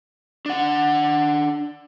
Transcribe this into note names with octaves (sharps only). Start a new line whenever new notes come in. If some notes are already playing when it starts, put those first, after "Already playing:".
D4 F#5